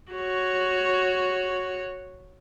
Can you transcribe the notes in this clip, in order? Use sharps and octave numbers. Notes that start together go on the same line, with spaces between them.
F#4 C#5